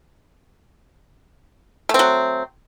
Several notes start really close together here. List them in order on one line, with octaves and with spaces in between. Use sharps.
A3 C4 F#3